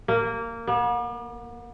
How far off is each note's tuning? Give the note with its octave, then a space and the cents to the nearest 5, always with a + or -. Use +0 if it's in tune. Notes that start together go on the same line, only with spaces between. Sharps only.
A#3 -15
B3 -45